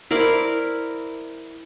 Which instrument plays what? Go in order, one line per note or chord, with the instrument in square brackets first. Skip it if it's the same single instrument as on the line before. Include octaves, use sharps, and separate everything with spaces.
[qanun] E4 A#4 C5 D5